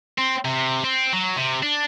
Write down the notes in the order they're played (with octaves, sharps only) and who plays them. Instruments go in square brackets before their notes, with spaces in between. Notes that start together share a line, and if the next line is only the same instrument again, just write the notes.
[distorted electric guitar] C4
C3
C4
F#3
C3
D4